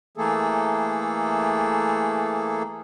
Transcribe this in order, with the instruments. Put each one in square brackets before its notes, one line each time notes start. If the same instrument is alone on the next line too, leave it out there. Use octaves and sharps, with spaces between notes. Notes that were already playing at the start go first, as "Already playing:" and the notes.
[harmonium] E3 A3 A#3 G#4 A4